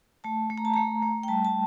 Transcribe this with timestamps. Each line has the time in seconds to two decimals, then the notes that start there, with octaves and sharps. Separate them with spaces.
0.24 A3 A5
0.50 A3
0.58 A#5
0.65 A5
0.74 A3 A#5
1.02 A3
1.23 G5
1.28 G3 A5
1.45 A5